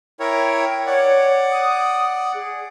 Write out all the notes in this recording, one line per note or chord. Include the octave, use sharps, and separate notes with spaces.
E4 A#4 C#5 G5
C#5 D5 F#5
D#6
G#4